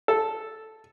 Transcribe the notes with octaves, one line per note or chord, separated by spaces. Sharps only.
A4